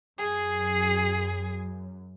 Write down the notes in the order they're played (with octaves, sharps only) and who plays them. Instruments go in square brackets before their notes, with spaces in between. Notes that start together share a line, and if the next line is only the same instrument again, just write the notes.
[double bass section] F#2 [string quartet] G#4